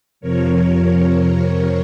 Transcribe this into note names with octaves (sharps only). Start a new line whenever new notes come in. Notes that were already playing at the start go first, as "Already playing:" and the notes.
F2 C3 F3 A#4 C#5